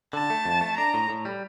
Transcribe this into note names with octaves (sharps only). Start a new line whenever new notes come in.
D3 A5
A3
F2
A3
D4 A#5
A2
A2
G3